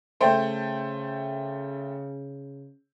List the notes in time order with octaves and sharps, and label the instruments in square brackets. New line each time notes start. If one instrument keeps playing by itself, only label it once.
[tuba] C#3 [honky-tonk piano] A3 C5 G5